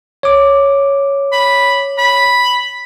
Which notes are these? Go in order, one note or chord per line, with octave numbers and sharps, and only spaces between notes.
C#5 D6
B5
B5